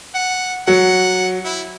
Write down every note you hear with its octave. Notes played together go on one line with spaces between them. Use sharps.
F#5
F#3 F#5
E4